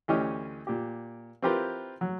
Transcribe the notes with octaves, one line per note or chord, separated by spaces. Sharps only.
D2 E3 C#4 G4 D#5 F6
A#2 G4
C4 E4 F4 G4 A#4 B4
F#3